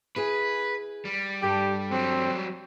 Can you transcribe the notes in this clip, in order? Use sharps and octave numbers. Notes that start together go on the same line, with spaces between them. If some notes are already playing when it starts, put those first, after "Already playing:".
E4 G#4 B4 G#5
G3
G2 G4 A4
F#3 G3 C4